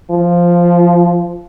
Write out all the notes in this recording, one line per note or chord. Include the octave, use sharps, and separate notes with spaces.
F3